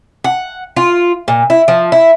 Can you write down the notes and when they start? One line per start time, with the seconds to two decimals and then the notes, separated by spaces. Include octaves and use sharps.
0.24 F#5
0.76 F4
1.28 A#2
1.50 E4
1.68 F3
1.92 E4